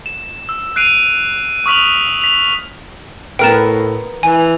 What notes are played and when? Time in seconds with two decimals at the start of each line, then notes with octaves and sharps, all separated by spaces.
0.06 E7
0.49 E6
0.76 F#6 C7 D7 D#7 F7
1.66 C#6 D#6 F6 B6 F7 F#7
2.21 B6 F7
3.39 A2 B3 A#4 B4 G5 E7
4.23 E3 G#5